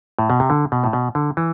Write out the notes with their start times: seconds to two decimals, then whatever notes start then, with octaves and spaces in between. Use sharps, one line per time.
0.19 A2
0.30 B2
0.40 C3
0.50 D3
0.72 B2
0.84 A2
0.93 B2
1.15 D3
1.37 E3